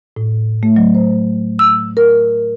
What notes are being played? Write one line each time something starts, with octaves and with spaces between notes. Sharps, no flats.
A2
A3
F#3
C5
E6
A#4